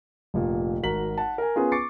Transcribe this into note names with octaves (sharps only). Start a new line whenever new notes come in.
F1 A#2
G#1 F#4 A#4 A#5 B6 F#7
F#5 A5
A#4 G#5
B3 C#4 F4 G#4 B4
C#6 D6 A6 C7 C#7